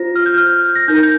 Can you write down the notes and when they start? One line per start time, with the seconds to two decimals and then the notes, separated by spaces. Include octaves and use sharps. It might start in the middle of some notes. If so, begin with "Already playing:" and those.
Already playing: F4 C5 A#6
0.16 F6
0.26 G6
0.38 F6
0.75 A#6
0.88 D#4 A#4 G6
1.03 G6